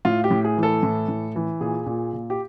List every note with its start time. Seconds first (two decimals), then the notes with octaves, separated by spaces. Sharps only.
0.05 A2 F4
0.24 G4
0.31 A2
0.44 G#4
0.58 E3
0.63 A4
0.83 A2
1.08 A2
1.36 E3
1.61 A#2 G#4
1.86 A#2
2.13 A#2
2.30 G4